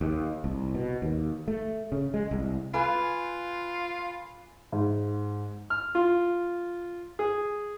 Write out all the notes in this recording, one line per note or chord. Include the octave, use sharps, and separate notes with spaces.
D#2
C2
B2
D#2
A3
C#3
G#3
C2
F4 B4 G#5 D6
G#2
F6
F4
G#4